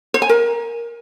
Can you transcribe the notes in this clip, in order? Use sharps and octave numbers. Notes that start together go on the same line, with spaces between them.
C5
G#5
A#4